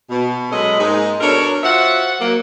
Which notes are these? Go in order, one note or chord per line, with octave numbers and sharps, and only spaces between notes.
B2
F#3 G#3 C#4 A4 B4 D#5
G#2 G#3 A#3 D#4
B2 D4 A4 A#4 C#5
F4 F#4 C5 E5 F#5
F#3 A#3